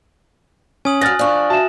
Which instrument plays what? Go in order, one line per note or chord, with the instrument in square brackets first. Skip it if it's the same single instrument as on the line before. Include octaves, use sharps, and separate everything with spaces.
[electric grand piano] C#4 [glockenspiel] G#5 D#6 F#7
[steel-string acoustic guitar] G2 F#3 [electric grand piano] F6 A6 A#6 [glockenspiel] F#6
[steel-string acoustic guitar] F3 D4 [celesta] D5 C#6
[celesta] F#4 E5 E7 [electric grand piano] A5